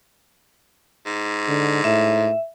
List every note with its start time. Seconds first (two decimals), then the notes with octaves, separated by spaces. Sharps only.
1.06 G#2
1.48 D3
1.84 A2 E5